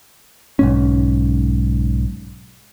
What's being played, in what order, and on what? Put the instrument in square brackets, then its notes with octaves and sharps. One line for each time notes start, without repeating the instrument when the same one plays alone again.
[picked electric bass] B1 G#2 C#4